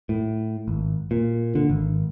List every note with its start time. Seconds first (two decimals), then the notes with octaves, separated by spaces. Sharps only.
0.09 A2
0.68 G#1
1.11 A#2
1.55 D3
1.69 G#1